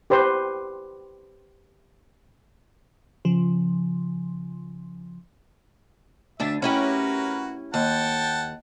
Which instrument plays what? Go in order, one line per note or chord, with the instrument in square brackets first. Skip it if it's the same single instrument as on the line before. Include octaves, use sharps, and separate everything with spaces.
[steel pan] G4 B4 C5
[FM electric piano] C#3 F3
[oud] D2 D4 [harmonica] E5
[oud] C#4 E4 G4 [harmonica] F#4 A#4 B4
[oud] D#2 [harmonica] F#5 G5 A5